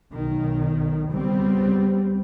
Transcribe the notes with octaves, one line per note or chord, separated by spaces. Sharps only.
B1 D#3
C#2 G3 B3 C4